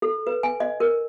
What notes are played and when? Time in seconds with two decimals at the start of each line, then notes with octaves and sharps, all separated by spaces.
0.02 A4
0.27 B4
0.43 G#5
0.60 D#5
0.80 A#4